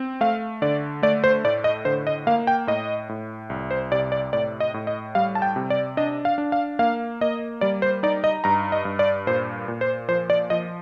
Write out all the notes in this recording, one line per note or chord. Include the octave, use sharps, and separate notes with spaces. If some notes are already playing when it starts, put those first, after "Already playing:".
Already playing: C4
A3 F5
D3 D5
A3 D5
C5
A2 D5
D#5
D3 C5
D#5
A#3 F5
G5
A2 D#5
A2
C2
C5
C3 D5
D5
A2 D5
D#5
A2
D#5
G3 F5
A5
G5
C3
D5
D4 D#5
F5
D4
F5
A#3 F5
A#3 D#5
G3 D5
C5
D#4 D5
D#5
G2 A#5
D#5
G2
D5
A#2 C5
A#2
C5
F3 C5
D5
F3 D#5